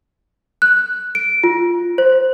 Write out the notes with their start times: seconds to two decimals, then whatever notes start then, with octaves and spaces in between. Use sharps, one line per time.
0.62 F#6
1.15 D7
1.44 F4
1.98 C5